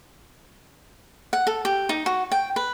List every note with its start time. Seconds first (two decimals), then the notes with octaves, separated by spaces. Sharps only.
1.33 F#5
1.47 A4
1.65 G4
1.89 D#4
2.06 F#4
2.32 G5
2.56 B4